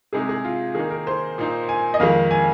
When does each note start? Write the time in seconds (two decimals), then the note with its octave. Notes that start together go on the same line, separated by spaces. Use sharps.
0.13 C3 G#3 D#4 G#4
0.29 G#4
0.45 F4
0.75 D#3 A#3 D#4 G#4
0.90 A#4
1.07 C5
1.38 A#2 A#3 D#4
1.69 G#5
1.94 D#5
1.99 F2 D#3 G#3 F5
2.31 G#5